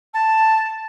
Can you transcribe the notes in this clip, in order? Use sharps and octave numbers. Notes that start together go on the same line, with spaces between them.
A5